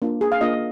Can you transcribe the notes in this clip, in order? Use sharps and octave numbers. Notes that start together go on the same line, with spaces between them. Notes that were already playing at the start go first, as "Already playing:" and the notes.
A#3 D4 F4
G#4
F5
A#3 D4 F4 D#5